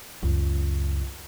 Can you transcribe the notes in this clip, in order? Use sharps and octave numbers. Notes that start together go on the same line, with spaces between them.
C#2 F#2